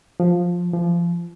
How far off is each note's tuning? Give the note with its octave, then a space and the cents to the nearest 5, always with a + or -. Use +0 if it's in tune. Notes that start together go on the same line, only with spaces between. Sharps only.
F3 +10
F3 -25